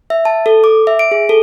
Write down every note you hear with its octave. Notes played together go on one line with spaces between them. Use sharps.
E5
A5
A4
D6
E5
D7
G#4
A4